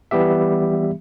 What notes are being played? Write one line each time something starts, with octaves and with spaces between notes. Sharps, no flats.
E3 G3 B3 G4 E5